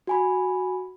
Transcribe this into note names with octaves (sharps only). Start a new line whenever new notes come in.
F#4 G#5 B5